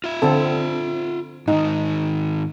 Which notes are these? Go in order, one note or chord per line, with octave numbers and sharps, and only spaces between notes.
F4 E5
D3 C4 A4
G#2 D#3 D#4